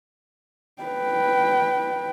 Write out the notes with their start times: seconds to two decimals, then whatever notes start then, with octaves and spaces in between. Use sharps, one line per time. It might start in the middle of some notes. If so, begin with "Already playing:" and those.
0.82 B4 G5